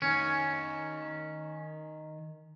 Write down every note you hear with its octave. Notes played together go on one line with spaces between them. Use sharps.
D#3 C#4 D#4 C#5